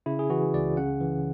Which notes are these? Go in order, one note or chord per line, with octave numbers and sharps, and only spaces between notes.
C#3 E4
G#4
E3 F#4
C#2 D5
C#3 F#5
E3